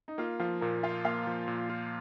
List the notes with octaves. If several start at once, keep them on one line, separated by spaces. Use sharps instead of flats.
D#4
A#3 F4
F3 F4
A#2 A#4
F4 F5
A#3 F5
F3
A#2
F4